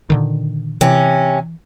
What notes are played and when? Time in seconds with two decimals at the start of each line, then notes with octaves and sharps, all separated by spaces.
0.10 A#2 D3 D#3
0.81 C3 E3 C#4